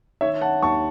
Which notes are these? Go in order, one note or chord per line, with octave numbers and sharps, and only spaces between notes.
D#3 C#5 E5
F#5 A5
D#2 A5 C#6